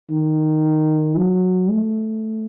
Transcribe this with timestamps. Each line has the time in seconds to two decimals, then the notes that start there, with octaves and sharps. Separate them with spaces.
0.10 D#3
1.17 F#3
1.70 A3